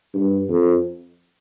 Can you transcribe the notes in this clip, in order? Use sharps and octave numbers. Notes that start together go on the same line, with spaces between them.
G2
F2